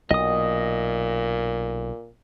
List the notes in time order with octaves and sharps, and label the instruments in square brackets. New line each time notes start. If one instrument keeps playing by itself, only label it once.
[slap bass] B1 [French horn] A#2 [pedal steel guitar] D#5 D#6